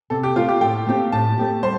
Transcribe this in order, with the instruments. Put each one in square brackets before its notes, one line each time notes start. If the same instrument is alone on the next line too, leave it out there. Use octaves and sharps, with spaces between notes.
[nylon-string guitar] C3 [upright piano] A4
[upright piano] G4
[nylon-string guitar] A3 C4 [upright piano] F4
[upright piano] G4
[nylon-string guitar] A2 [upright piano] G5
[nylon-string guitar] A3 C4 G4
[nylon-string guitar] A2 [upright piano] A5
[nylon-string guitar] A3 C4 G4
[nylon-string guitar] G3 [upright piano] C5